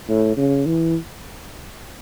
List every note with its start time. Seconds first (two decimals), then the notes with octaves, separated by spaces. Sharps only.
0.09 A2
0.37 C#3
0.66 E3